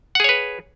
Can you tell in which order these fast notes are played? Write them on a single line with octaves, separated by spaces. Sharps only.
F#5 G#4 C#5 B4